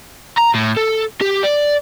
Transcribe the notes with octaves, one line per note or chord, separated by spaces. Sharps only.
A#5
A2
A4
G4
D5